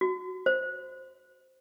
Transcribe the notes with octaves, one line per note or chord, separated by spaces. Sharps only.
F#4
C5